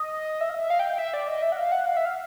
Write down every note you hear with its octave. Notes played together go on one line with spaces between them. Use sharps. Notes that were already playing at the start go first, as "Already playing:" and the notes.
Already playing: D#5
E5
F5
E5
F5
G5
G5
E5
D5
D#5
E5
F#5
F5
F#5
F5
E5
F5